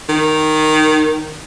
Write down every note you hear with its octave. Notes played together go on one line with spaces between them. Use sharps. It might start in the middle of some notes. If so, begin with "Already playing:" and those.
D#3